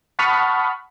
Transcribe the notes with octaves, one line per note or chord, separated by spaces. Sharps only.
F#5 A5 B5 C#6 D#6 F6